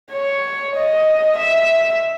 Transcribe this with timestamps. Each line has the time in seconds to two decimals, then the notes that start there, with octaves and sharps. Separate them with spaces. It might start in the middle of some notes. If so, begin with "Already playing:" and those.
0.12 C#5
0.76 D#5
1.38 E5